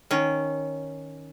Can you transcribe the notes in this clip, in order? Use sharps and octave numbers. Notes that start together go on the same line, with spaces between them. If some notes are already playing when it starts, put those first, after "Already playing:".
D#3 C#4